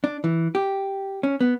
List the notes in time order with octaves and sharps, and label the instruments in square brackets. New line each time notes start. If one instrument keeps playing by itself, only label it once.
[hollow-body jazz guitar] D4
E3
G4
C#4
B3